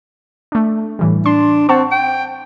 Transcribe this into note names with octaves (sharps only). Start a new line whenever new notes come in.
A3 D4
A2 E3 G3
D4 C6
C4 F#5 A5 C#6
G5